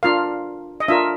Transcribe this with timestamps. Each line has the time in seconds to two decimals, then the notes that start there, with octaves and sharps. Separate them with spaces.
0.03 D4 F4 A#4 F5
0.80 D#5
0.88 D4 F4 A#4 E5